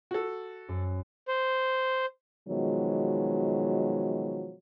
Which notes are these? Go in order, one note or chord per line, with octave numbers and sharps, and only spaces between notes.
F#4 A4
F#2
C5
B2 D#3 F3 F#3 G#3